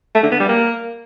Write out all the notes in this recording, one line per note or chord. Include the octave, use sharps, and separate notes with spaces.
A3
D3
B3
G3
A#3